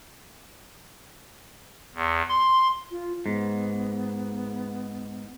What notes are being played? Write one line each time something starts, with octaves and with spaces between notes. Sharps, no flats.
E2
C6
F4
G#2 B3